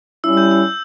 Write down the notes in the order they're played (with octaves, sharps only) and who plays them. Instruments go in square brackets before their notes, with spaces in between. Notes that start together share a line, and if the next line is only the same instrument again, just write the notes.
[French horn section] G3 C#4 E4 [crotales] E6
[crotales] G6
E6